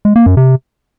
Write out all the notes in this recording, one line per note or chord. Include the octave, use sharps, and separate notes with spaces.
G#3
A#3
F#2
C3